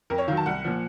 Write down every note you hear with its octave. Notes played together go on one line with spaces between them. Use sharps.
F2 A#4
C#5
D#3 F#3 F5
A5
C2 F#5
A#2 F3